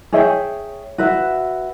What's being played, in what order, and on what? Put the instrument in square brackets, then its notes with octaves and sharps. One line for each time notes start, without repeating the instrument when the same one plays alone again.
[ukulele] G#4 C#5 E5 G5
F#4 B4 E5